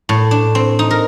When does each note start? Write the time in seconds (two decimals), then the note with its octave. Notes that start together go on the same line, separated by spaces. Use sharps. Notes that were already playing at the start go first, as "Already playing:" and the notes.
0.09 A2
0.31 D4
0.55 C4
0.79 D#4
0.91 A#4